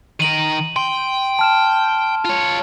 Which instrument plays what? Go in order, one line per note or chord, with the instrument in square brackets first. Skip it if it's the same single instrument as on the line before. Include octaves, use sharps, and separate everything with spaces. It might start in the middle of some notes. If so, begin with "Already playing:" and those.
[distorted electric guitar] D#3 A#4 [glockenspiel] D#7 F#7
[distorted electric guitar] G5 [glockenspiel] C6
[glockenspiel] A5 F6 E7
[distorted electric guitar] F4 C#5